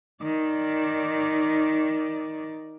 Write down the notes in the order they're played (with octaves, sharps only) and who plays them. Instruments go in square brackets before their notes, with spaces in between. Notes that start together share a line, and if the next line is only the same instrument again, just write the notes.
[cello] D#3 D5